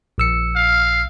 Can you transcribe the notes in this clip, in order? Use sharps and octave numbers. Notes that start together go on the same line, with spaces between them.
A#1 E6 C#7
F5